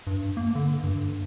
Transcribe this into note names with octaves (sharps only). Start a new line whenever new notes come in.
G2
A#3
D3
G2